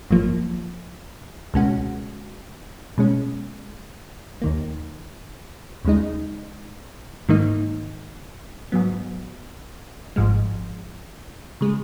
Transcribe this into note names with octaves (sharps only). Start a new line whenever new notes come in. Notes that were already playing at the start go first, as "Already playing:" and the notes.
G#1 F#2 F3 A#3
C#2 B2 G#3 C#4 F#4
B2 G#3 C#4
D#2 D#3 A#3
D#2 C#3 G#3 D#4
G#2 D#3 A#3 D#4
G#2 F#3 B3
G#1 G#2 F3 G#3
C#3 G#3